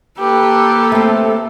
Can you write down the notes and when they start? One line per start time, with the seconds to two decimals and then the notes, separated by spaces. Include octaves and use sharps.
0.20 A#3 G4 A4 B4
0.92 A3 C4